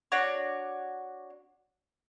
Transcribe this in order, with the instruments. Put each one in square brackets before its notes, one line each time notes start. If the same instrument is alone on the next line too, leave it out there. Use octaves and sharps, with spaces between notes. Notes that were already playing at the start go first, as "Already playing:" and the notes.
[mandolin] D4 F#4 C#5